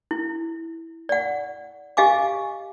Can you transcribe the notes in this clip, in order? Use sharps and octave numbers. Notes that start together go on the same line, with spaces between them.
E4
D5 F#5
G4 D#5 F5 G#5 D6